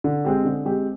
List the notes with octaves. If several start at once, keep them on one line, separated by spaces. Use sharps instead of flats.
D3
G#3 C4 G4
D3
G#3 C4 G4